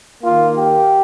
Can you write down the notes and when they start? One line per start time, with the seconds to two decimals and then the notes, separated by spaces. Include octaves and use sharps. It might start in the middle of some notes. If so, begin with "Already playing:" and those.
0.22 D#3 A#3 F4
0.57 G4